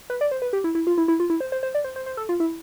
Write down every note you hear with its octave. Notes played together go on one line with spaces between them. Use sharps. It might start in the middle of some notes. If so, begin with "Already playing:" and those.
B4
D5
C5
B4
G4
E4
E4
F4
E4
E4
F4
E4
C5
C5
C5
D5
C5
C5
C5
A4
F4
E4